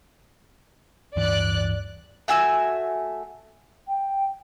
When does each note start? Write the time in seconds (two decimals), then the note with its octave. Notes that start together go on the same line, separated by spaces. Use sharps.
1.16 D1 G2 E3 D5 F#6
2.28 A3 F#4 G#5 E6
3.88 G5